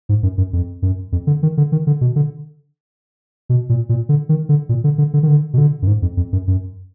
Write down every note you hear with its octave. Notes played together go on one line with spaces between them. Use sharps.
G#2
F#2
F#2
F2
F#2
F2
D3
D#3
D3
D#3
D3
B2
D3
B2
A#2
A#2
D3
D#3
D3
A#2
D3
D3
D3
D#3
D3
B2
D3
F#2
G#2
F2
F2
F#2
F#2